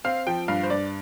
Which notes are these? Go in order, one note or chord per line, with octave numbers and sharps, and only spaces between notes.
C4 F5
F3 G5
G2 F5
C5
G2 D5